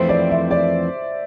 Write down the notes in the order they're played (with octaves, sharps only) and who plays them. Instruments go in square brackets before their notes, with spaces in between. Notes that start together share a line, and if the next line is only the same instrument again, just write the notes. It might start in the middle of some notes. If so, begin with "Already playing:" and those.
Already playing: [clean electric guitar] F2 E3 A3 C4 [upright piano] C5
[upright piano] D5
E5
D5